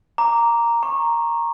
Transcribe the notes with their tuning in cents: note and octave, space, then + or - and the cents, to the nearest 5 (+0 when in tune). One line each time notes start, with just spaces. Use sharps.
A#5 +0 D6 -10
A#5 +0 C#6 -25